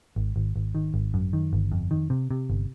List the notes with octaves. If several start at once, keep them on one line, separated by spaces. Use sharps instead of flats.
G#1
G#1
G#1
D#3
G#1
F#2
D#3
G1
F2
D#3
C3
C3
G1